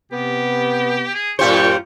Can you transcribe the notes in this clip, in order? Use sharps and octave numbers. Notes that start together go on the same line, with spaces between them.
C3 B3 G4
G#4
F#2 A2 F4 G4 C5 C#6